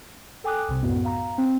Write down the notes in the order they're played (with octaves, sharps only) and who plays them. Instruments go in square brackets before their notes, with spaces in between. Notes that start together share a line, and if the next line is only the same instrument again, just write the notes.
[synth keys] A4 G5 G#5 D6 D#6 F#6
C2 C3
F#2 A2 B3 F#4
F5 A#5
C4